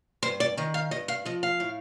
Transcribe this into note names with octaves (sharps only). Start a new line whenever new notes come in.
G2 C5
D5
D#3 D#5
F5
G2 D#5
F5
F3 D#5
F5
A2